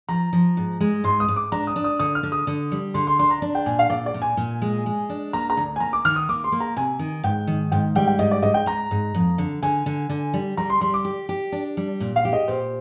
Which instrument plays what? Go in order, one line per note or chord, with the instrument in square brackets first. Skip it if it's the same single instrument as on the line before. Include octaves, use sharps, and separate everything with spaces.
[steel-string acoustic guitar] F3 [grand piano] A#5
[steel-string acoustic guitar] F3
G#2
G#3
[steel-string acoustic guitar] G#2 [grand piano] C6
[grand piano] D#6
[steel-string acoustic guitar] G#2
[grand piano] D6
[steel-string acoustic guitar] D4 [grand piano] A#5
[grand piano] D#6
[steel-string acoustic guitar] D4
[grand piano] D#6
[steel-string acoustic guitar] D3 [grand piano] D#6
[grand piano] F6
[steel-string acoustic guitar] D3
[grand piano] D#6
[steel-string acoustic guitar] D3
G3
[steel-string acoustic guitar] D3 [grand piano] C6
[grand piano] C6
[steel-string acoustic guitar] D4 [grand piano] C6
[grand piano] A#5
[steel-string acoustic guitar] D4
[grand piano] G5
[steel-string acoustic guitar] A#2 [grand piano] G#5
[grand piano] F5
[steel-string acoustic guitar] A#2 [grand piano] D5
[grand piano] D5
[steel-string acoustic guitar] A#2
[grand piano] G#5
[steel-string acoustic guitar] A#2
G#3
G#3
D4
[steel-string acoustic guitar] A#3 [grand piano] A#5
[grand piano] A#5
[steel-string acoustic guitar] D2
[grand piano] G#5
[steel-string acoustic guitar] A#3 [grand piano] A#5
[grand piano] D6
[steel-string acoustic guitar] D#3 [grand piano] F6
[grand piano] D#6
[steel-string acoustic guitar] A#3 [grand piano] D6
[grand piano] C6
[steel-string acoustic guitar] A#3
[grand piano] A#5
[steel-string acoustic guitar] C3 [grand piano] G#5
[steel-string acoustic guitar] D#3
[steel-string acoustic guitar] G#2 [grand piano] G5
[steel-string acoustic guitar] D#3
[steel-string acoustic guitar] G#2 [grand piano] G5
[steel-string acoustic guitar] G3 [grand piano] G5
[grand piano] G5
[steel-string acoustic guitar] G#2 [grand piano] D#5
[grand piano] D5
[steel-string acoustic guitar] G#2 [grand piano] D#5
[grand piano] G5
[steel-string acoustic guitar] G#2 [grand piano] A#5
[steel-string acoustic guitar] G#2
F2
D3
[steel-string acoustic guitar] D3 [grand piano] G#5
[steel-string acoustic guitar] D3
D3
G3
[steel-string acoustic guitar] G3 [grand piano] A#5
[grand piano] C6
[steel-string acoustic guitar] G3 [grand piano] C6
[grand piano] D6
[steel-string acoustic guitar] G4
G4
D4
G3
A#2
[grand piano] F5
[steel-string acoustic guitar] G4
[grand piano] D#5
[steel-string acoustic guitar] A#2 [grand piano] C5